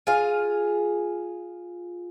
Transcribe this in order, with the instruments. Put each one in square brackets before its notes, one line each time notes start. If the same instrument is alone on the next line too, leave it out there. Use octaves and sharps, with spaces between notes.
[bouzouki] F4 G#4 F5